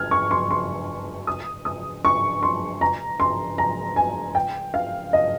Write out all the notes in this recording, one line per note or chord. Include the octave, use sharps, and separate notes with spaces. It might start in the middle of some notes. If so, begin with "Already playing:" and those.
Already playing: F6 G#6
C#6
C6
C6
D#6
D#6
C#6
C6
A#5
C6
A#5
G#5
G5
F5
D#5